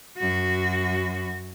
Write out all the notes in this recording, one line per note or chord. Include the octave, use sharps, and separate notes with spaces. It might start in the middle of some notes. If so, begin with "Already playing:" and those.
F#2 F#4